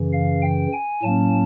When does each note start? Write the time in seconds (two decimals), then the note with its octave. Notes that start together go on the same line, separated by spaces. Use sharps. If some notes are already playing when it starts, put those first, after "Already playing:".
Already playing: F#2 C#3 E3
0.13 F5
0.42 G5
0.73 G#5
1.03 A2 F#3 A#3 C#4 A5